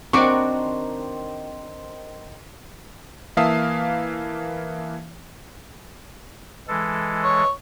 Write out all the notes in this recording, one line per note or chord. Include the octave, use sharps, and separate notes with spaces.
D#3 C4 D4 F#4 C5 A#5 C#6 D6
E3 A#3 E5 F5 A5 D#6
E3 G#3 A4
C#5